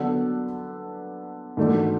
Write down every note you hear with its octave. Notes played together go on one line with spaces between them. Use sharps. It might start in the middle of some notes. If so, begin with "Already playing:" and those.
Already playing: D3 F#3 B3 D4 A4
G#2 E3 A3 D4 F#4